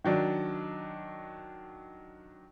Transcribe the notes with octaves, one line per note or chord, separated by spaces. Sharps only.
D#3 F#3 D4